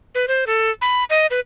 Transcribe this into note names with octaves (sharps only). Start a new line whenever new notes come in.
B4
C5
A4
B5
D#5
B4